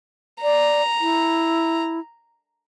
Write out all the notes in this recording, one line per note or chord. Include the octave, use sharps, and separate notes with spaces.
D5 A#5
E4